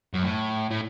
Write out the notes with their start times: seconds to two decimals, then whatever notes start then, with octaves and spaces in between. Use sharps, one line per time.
0.14 F#2
0.23 A2
0.71 A2